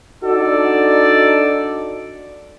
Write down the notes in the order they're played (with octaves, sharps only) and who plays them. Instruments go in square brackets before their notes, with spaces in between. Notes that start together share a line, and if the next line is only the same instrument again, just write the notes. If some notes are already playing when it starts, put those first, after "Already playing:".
[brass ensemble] D4 D#4 F#4 A4 D5